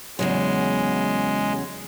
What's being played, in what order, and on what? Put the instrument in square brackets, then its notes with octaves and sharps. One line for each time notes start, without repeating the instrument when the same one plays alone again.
[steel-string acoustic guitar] E2 C#3 F#3 [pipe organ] G#3